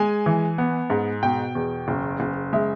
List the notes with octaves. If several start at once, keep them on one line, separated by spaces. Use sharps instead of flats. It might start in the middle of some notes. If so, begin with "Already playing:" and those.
Already playing: G#3 G#5
E3
B3
G#2
B2 G5
E2
F#1
F#1
G#3 E5